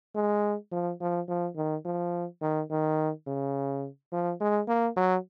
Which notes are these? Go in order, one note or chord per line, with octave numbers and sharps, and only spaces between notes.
G#3
F3
F3
F3
D#3
F3
D#3
D#3
C#3
F3
G#3
A#3
F#3